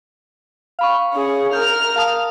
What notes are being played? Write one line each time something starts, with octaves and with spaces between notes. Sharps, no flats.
F5 B5 C#6
C#4 G#4
A#4 F6 G6
F5 A5 D#6